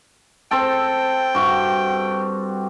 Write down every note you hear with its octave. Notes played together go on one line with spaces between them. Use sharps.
C4 A4 G5
G2 F#4